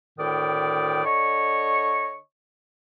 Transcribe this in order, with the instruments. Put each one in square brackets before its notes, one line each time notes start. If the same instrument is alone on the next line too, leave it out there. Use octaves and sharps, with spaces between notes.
[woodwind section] D2 A2 D#3 D5 G5 D#6
D3 C#5 D#5 C#6